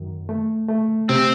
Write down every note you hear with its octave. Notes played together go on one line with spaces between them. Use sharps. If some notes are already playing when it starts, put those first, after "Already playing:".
Already playing: F#2 D#3
A3
A3
C3 C4